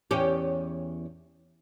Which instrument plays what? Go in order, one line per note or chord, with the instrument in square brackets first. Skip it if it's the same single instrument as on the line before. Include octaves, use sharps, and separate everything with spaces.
[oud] E2 C#4 G4